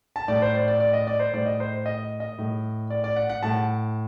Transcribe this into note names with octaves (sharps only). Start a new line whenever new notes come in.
A5
A2 D5
C5
D5
D5
D5
D#5
D5
C5
A2 D5
D#5
C5
D#5
D#5
A2
D5
D5
F#5
F#5
A2 A5